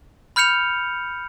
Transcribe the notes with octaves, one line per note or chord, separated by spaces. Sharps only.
B5 F6 G6 C#7 F7